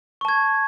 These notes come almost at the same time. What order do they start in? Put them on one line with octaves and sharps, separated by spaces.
C#6 A5 G#6